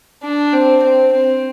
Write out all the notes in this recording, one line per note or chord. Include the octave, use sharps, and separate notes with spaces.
D4
C4
C4
C4